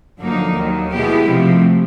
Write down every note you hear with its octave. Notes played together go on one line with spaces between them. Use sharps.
F#2 D3 F3 A#3 D#4
D#2 D#3 F#3
B2 G#3 B3 E4 G4
C3 F3 A3